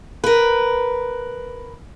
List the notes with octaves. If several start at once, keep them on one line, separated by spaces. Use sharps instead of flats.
A#4 B4